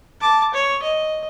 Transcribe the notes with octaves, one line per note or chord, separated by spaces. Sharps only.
A5 D6
C#5
D#5